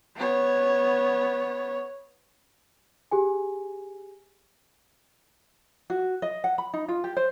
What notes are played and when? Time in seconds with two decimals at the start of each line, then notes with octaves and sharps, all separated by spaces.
0.16 B3 C#5
3.11 G4 G#4 G#5
5.90 F#4
6.22 D#5
6.44 F#5
6.58 B5
6.74 D#4
6.88 F4
7.04 G4
7.17 C5